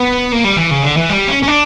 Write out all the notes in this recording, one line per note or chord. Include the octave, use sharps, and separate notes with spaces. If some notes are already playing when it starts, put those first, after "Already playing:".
Already playing: B3
A#3
G3
E3
C#3
D3
E3
G3
C#4
C#4
D4